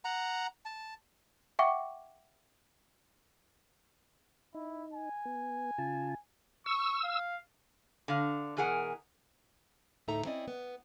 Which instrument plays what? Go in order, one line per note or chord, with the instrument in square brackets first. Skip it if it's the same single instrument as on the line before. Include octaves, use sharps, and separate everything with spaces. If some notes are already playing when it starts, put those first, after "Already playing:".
[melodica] F#5 A#5
A5
[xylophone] E5 F#5 G5 C#6 D6
[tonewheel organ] D#4 [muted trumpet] E4
[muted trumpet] G#5
[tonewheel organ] B3
C#3 F4 A5
[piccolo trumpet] C#6 [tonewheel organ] E6
[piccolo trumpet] F5
[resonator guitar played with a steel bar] D3 F5
B2 E3 G#4 A#4 F#5
[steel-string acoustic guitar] D2 A2 D#4 A4 E5 A#5
C4 C#4 E4 D5 D#5
B3